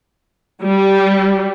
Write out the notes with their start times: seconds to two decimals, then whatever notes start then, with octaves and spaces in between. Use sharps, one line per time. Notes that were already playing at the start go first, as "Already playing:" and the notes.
0.61 G3